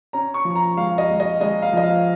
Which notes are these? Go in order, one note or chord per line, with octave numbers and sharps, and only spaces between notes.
C#4 A#5
C#6
F3
A#5
G#3 F5
D#5
G#3
D#5
G#3 D#5
F5
F3 D#5
F5